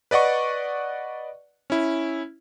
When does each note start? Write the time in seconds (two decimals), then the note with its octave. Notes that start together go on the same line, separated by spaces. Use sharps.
0.11 B4 D5 D#5 F#5 C#6
1.70 C#4 E4